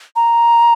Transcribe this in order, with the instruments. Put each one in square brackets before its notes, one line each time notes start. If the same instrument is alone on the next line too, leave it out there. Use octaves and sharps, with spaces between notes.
[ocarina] A#5